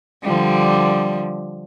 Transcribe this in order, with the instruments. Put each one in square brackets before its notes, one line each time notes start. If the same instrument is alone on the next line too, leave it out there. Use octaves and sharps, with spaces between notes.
[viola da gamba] D3 F3 G3